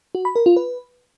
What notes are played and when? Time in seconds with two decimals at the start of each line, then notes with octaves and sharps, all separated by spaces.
0.15 F#4
0.25 B5
0.36 A#4
0.46 F4
0.56 B4